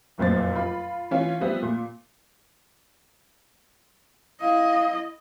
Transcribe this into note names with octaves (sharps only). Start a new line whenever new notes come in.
F1 F#2 A#2 F3 A6
F4 B5
E3 C#4 F4
F3 G3 B3 E5
A#2
E4 D#5 F5